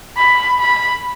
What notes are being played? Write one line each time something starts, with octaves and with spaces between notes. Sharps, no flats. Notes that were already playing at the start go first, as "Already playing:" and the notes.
B5
B5